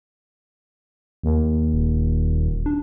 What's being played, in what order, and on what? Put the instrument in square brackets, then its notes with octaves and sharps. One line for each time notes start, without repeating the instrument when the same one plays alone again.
[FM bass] D#2
[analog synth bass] D#1
D4